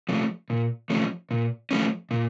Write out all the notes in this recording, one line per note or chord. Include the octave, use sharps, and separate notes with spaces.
F3 A3 C#4
A#2
F3 A3 C#4
A#2
F3 A3 C#4
A#2